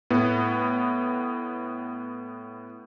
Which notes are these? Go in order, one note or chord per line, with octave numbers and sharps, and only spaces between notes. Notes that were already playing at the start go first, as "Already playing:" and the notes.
A2 B3